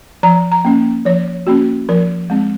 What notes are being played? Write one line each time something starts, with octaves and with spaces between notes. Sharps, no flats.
F3 A#5
A#5
A#3 C#4
F3 C#5
A#3 C#4 F#4
F3 A#4
G#3 C4